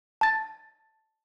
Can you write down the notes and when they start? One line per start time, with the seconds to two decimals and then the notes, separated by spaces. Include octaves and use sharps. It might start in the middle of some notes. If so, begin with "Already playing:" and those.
0.21 A5 A6